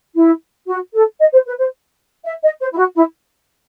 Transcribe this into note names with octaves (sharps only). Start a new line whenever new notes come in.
E4
F#4
A4
D#5
C5
B4
C5
E5
D#5
C5
E4
F#4
E4